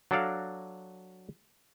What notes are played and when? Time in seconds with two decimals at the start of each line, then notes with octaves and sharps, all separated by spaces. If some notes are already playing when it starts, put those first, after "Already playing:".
0.11 F#3 D4 F#4 A4 D5 F5